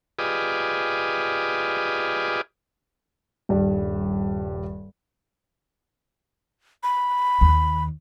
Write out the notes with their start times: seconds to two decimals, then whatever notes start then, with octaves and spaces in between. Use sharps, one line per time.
0.19 F4 G4 G#4 B4 D5 D#5
3.49 D#1 G2 G3
6.83 B5
7.41 D#2